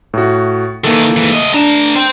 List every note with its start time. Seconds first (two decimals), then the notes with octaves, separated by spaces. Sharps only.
0.14 A2 F#4
0.84 D#3 E3 A#3 A4
1.17 G#2 E3
1.31 A3 D#5
1.54 A3 D4 A#5 E7
1.95 C5 G5